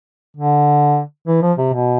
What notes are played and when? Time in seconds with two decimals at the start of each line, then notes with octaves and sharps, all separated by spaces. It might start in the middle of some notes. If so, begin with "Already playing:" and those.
0.37 D3
1.27 E3
1.42 F3
1.58 C3
1.73 B2